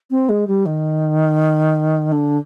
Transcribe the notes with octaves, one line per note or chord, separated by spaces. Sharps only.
C4
G#3
G3
D#3
D3